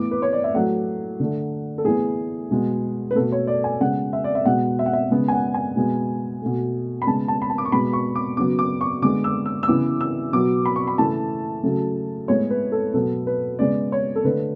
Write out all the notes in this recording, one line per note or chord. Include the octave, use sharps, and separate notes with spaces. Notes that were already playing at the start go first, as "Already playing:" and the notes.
Already playing: A2 E3 B3 D6
B4
C#5
D5
E5
A2 F#3 A3 F#5
D3 A3
A4
A2 E3 B3 G#4
B2 G#3 B3
B4
B2 A3 A4
C#5
D5
G#5
C#3 G#3 B3 F#5
E5
D5
E5
B2 G#3 B3 F#5
E5
F#5
E5
C#3 G#3 B3
G#5
F#5
G#5
B2 G#3 B3
B2 A3
B5
C#3 G#3 B3 A5
A5
B5
A5
D6
C#6
B2 G#3 B3 B5
C#6
D6
C#3 F#3 B3 D6
D6
C#6
D3 G#3 B3 D6
E6
E6
E6
C#3 E3 B3 D6
E6
B2 F#3 B3 D6
B5
C#6
B5
C#3 E3 A3 A5
C#3 F#3 A3
A2 G#3 B3 C#5
B4
A4
B2 F#3 B3 A4
B4
C#3 G#3 B3 D5
C#5
A4
D3 A3 B4